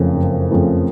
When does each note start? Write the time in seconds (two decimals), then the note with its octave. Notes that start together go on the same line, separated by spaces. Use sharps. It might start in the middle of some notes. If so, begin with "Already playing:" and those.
Already playing: F#1 F2 C#3 F3 A3
0.16 F#1
0.50 F2 C#3 F3 A3